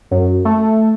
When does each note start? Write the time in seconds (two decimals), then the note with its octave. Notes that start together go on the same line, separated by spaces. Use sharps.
0.11 F#2
0.45 A3